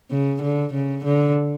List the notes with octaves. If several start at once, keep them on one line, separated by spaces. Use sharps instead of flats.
C#3
D3
C#3
D3